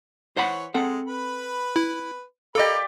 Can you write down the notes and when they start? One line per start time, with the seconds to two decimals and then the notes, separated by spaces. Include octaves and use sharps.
0.37 E3 C5 C#5 F#5 B5
0.74 G#3 C4 A4 F#5
1.08 B4 B5
1.76 E4
2.55 G4 A4 A#4 D5 D#5 F5 B5